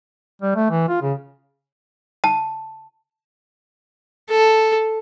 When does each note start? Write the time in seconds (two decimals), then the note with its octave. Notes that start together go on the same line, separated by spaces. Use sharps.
0.42 G3
0.55 A3
0.70 E3
0.88 F4
1.02 C#3
2.24 A5
4.30 A4